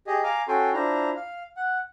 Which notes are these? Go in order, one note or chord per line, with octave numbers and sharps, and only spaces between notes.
G4 G#4 D#5
F5 G#5 A#5 D6 F6
C#4 F#4 A4 G5 G#5 C6
D4 E4 F4 C5 A#5
F5
F#5